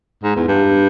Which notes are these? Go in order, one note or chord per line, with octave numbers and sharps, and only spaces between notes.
G#2
E2
G2